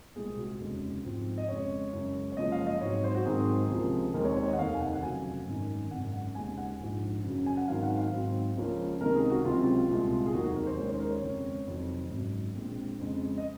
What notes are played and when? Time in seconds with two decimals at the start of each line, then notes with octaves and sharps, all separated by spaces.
0.16 C2 A#2 G#3 C4 G#4
0.38 F#4
0.60 F1 D#2 C#3 G#3 C#4
1.04 G#2 F3 C4
1.38 D#5
1.49 F2 C#3 G#3 C#5
1.93 F#2 C#3 G#3
2.32 C#5
2.37 F#1 F#2 F3 G#3 D#5
2.52 F5
2.67 D#5
2.81 G#2 F#3 C4 C#5
3.04 C5
3.15 F#4
3.26 G#2 D#3 F#3 C4 G#4
3.70 C#2 C3 F3 A#3
4.14 D#2 D#3 G#3 C4 A#4
4.25 C#5
4.36 C#5
4.47 D#5
4.53 F#5
4.58 F1 D#2 D#3 F5
4.74 G#5
4.80 F#5
4.95 F#5
5.02 F1 F2 C#3 F#3 G#5
5.47 G#1 F#2 D#3
5.91 G#1 F#2 C#3 F#5
6.13 F#5
6.35 D#2 C#3 G#3 G#5
6.58 F#5
6.80 A#1 G#2 F3
7.24 F#2 C#3 F#3 C#4
7.46 G#5
7.57 F#5
7.68 G#2 D#3 F#3 C4 F5
7.83 F#5
7.97 F5
8.12 G#2 F#3 C4
8.57 C#2 C#3 F3 A#3 C#4
9.00 C#2 C3 D#3 A#3 A#4
9.15 G#4
9.30 F#4
9.45 C#2 C3 F#3 C4 F4
9.63 F4
9.89 C2 A#2 G#3
10.26 G#4
10.33 F1 D#2 D#3 F#3 A#3 F#4
10.44 F#4
10.55 A#4
10.66 C5
10.78 D#2 D#3 G#3 C#4 C#5
10.88 C5
11.00 A#4
11.11 C#5
11.22 F2 C#3 G#3 C4
11.66 F1 F2 D#3 F#3
12.11 G#1 F#2 C#3 F#3
12.55 A#1 A#2 G#3 C4
12.99 F2 C#3 G#3
13.38 D#5